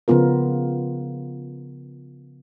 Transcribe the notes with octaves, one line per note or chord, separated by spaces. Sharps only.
C#3 F3 B3 F4 A#4